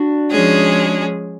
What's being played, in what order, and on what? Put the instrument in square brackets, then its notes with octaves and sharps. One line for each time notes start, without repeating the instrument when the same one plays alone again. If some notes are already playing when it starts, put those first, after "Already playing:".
Already playing: [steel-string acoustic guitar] D4 F#4
[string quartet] F3 G#3 C#4 G#4